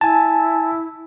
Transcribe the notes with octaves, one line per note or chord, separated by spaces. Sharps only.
E4 G#5 A5